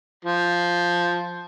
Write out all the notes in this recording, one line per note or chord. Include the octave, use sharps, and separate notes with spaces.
F3